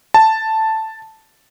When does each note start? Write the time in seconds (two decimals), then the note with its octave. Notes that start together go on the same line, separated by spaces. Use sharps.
0.14 A5